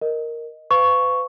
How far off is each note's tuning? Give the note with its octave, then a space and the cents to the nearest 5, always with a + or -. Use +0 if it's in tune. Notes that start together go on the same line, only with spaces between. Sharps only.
A#4 +0 D#5 +0
B4 +40 F5 +0 C#6 +0